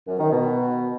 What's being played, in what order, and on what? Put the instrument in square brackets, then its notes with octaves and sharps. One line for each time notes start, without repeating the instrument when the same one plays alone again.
[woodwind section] F#2
D#3
B2